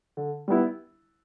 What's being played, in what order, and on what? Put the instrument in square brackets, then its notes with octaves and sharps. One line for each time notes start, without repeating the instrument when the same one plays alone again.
[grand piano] D3
G3 B3 E4